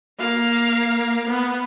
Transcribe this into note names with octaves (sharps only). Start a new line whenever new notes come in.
A#3 F5
B3